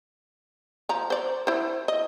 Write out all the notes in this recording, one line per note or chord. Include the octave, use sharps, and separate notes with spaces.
F3 A#5
C5 D5
E4 C5
D#5